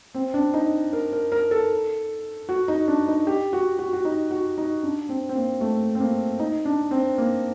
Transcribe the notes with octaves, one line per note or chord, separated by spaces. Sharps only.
C4
D4
D#4
A#4
A#4
A#4
A4
F#4
D#4
D4
D#4
G4
F#4
F#4
F#4
D#4
F#4
D#4
D4
C4
C4
A#3
A3
C4
A#3
D#4
D4
C4
A#3